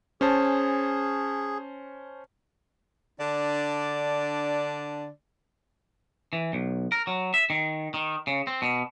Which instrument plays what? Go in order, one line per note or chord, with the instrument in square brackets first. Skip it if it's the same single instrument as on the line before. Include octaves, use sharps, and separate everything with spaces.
[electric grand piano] C#4 C5 A5 [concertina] G#4
[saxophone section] D3 D4 D5
[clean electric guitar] E3
B1
A#4
F#3
E5
D#3
D#3
C#3
C4
B2